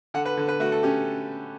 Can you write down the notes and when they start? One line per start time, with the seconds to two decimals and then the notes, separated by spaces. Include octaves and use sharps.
0.14 D3 F#5
0.25 B4
0.37 D3
0.48 B4
0.60 A3 F#4
0.72 A4
0.83 C#4 G4